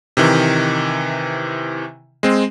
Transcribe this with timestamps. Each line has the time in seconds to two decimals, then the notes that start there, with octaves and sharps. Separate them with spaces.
0.17 C3 D#3 E3
2.23 G#3 C4